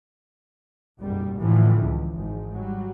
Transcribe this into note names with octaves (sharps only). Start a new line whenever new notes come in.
F#1 B1 G#2 G3
A2 D3 E3 F3
C#2
G#1 G#2
F#3 G3